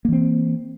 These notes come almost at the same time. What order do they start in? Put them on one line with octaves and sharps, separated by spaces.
A#3 E3 C4